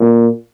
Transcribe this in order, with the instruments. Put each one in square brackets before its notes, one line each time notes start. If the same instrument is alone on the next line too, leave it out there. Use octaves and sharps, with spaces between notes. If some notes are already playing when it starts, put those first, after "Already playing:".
Already playing: [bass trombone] A#2